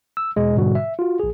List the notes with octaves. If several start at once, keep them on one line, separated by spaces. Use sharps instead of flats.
E6
E2 B2 G#3
G#2 B2 D3 G3 F#4
E5
F4 F#4
A#1 G#4